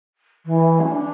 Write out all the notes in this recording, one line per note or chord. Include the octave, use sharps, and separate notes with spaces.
E3
C#4
D4